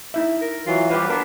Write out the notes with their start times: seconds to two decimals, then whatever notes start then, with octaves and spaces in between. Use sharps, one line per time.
0.14 D#4 E4 E5
0.42 A#4
0.67 E3 F#3 F4
0.90 F3 G3 G4 B4
1.10 B3 D4 A#4